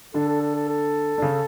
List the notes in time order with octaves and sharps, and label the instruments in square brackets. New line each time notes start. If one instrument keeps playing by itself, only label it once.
[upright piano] D3 D4 [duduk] A4
[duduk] A4
A4
A4
A4
[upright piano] D4
C#3 C#4